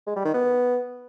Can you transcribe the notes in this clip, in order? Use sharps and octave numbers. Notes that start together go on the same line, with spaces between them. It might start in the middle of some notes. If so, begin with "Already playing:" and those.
G#3
G3
D#3
B3